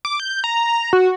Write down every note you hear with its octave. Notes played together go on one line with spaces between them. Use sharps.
D6
G6
A#5
F#4